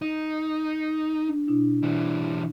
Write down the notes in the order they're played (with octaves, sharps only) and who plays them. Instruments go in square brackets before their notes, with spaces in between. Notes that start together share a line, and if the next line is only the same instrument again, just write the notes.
[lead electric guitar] D#4
[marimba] D4
B2 D4 E4
[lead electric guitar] E3 G3